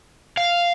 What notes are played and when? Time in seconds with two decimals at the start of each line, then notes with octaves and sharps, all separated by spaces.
0.37 F5